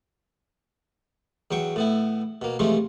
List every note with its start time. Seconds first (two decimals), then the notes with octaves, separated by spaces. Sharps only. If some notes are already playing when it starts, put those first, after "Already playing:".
1.51 E2 F#3 G5 C#6
1.76 A2 B3 E4
2.42 B2 A#3
2.59 C3 E3 F3 G#3 A3 C#4